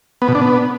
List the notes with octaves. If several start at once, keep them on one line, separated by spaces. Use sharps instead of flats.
B3
B2
D4
B3